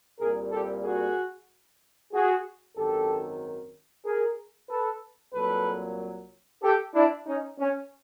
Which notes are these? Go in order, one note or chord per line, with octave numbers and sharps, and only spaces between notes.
C2 A#2 G3 A#3 G#4 A#4
G4 A4
F#4 G#4
F#4 G#4
G#1 F#2 D#3 G4 A4
G#4 A#4
A4 B4
C2 A#2 F#3 A#3 A4 B4
G4 A4
D4 E4
C#4 D#4
C#4